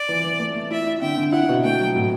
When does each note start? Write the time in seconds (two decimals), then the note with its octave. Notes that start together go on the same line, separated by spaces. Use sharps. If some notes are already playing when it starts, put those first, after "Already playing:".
Already playing: D5
0.09 E3
0.24 E3
0.39 A3
0.55 A3
0.71 E4 E5
0.87 E4
1.02 D3 G5
1.17 D3
1.32 E4 F#5
1.49 B2
1.64 A3 G5
1.80 F#3
1.96 A2